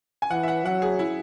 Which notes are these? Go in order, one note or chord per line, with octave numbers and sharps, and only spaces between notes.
G#5
E3 F#5
E5
F#5
F#3 F#5
G#4
E4